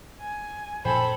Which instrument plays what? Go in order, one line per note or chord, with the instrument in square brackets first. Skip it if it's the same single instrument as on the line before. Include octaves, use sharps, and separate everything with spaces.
[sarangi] G#5
[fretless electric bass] F#2 A#2 F3 [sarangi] A4 [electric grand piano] C5 G5 G#5 [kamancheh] B5